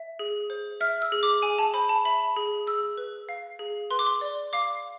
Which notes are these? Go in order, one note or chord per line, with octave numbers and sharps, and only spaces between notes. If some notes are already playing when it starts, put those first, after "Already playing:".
Already playing: E5
G#4
C5
E5 F6
E6
G#4
D6
G#4 G#5
A5
C5 B5
A5
E5 B5
G#4
G#4 E6
B4
F5
G#4
B4 C6
D6
C6
D5
F5 D6